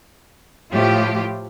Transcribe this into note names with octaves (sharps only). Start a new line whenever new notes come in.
A2 F3 A3 E4 F4 G4